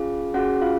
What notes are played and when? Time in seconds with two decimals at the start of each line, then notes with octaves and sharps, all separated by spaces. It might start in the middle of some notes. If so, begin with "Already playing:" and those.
Already playing: C#4 F4 G#4 F5
0.34 C#4 F#4 G#4 F#5
0.61 F4 F5